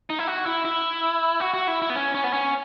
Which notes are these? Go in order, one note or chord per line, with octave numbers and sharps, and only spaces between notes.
D#4
E4
F#4
E4
E4
F#4
F#4
E4
E4
B3
C#4
C#4
B3
C#4